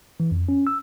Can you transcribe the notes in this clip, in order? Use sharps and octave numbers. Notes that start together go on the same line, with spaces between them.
E3
F2
C#4
E6